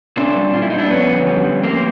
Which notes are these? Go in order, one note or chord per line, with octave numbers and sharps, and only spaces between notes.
A#2 C4 D4
G3
A#2 F4
E4
G3 D#4
D4 E4
F2 B3 C#4
D3
G3
F2
A2 A#3 C4